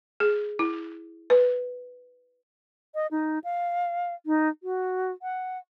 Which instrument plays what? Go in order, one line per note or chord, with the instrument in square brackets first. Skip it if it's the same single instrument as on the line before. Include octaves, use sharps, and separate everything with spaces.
[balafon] G#4
E4
B4
[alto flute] D#5
D#4
F5
D#4
F#4
F#5